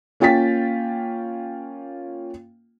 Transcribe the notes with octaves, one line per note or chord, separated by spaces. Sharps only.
A#3 C#4 F4 G5 A6 B6